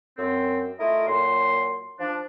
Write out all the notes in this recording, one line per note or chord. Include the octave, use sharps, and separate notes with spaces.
F#2 C4
A3 E4 F4 A#4 D#5
A#2 F#3 C6
F3 D4